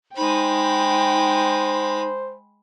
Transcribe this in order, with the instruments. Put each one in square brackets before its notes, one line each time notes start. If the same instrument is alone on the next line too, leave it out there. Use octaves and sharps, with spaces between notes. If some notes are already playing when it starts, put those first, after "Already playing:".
[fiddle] G#3 B5 [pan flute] D#4 [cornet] C5 [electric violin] G5